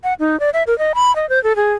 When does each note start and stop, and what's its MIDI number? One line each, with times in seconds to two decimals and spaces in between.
0.04 0.14 78
0.20 0.39 63
0.40 0.50 74
0.54 0.63 76
0.67 0.77 70
0.78 0.92 75
0.95 1.14 83
1.16 1.29 75
1.29 1.42 72
1.44 1.56 69
1.56 1.73 68